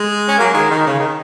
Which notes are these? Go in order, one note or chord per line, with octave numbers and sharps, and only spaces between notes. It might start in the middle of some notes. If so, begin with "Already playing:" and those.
Already playing: G#3
C#4
F#3 A#3
D#3 G#3
D#3
C#3
D#3